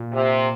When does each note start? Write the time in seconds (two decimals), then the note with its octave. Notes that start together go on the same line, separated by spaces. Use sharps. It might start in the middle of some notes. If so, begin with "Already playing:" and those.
Already playing: A#2
0.13 C3